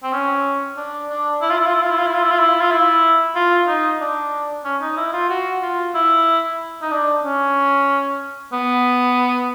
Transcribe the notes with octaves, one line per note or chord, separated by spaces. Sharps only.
C4
C#4
D4
D4
E4
F4
E4
F4
E4
F4
E4
F4
E4
F4
E4
F4
E4
F4
E4
F4
D#4
D4
C#4
D#4
E4
F4
F#4
F4
E4
D#4
D4
C#4
B3